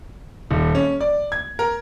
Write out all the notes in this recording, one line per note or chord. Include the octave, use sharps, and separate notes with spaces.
D#1
C#4
D5
G#6
A#4